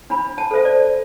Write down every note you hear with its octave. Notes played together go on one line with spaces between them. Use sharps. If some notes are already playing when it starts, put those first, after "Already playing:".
D4 B5
A5
A4 C5 E5
D5